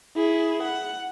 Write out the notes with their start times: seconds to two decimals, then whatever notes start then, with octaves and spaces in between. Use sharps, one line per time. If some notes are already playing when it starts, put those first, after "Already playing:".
0.16 E4 G#4
0.63 F#5